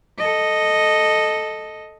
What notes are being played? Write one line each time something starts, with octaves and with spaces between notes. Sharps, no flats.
A4 D#5